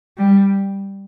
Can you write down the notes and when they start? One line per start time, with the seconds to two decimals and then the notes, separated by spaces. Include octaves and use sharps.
0.18 G3